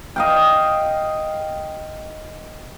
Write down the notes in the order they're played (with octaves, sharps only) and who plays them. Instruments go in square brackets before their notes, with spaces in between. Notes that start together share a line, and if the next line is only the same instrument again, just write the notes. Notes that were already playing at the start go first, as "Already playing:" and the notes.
[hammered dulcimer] D#5 F5 G5